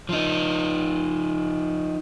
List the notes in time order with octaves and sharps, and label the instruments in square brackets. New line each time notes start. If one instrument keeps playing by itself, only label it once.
[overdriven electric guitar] F3 D#4